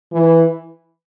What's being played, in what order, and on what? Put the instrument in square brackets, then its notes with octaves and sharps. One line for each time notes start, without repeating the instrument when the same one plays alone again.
[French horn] E3